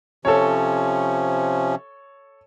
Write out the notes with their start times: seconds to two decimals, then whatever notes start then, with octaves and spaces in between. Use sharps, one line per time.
0.25 C3 F3 C#4 A4 C#5